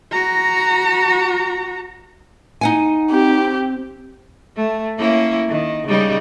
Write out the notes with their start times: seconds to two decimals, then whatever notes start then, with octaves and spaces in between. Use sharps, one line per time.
0.12 F#4 A#5
2.61 D#4 F#5 G#5
3.11 C4 G4
4.57 A3
4.99 A#3 C#4 E4
5.49 D#3
5.88 C#3 G3 D#4